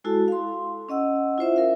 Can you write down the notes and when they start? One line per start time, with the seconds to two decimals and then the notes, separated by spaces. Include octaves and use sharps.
0.04 G#3 E4 F#4 A4 A5
0.28 F5 C6
0.89 C#4 D#5 F#5 E6
1.38 E4 F4 C5 E5
1.56 A#4 E5 F5